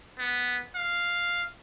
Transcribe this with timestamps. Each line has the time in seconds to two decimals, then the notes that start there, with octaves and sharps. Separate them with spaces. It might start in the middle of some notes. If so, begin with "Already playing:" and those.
0.19 B3
0.76 F5